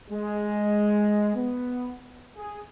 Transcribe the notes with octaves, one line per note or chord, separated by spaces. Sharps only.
G#3
B3
G#4